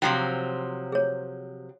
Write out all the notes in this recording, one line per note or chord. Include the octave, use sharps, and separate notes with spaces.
C3 F3 F#3 G5
G#4 C#5